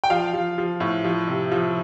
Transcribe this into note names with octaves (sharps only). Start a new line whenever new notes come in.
G5
F3 F5
F3
F3
A2
F3
C3
F3